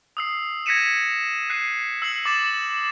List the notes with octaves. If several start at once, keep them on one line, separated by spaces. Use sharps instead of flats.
D#6 E6 C7
G#6 A#6 B6 C#7 D#7 E7
F#6 C7 D#7
E6 C7 F#7
D6 A6 E7